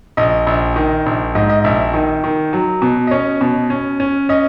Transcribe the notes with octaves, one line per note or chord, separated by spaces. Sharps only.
A#1 D#5
A#1
D#3
A#1
G#2 D#5
D#5
A#1 E5
E5
D#3 D#5
D#3
F#3
B2
D#5
C#4 C#5
B2
C#4
C#4
C#4 D#5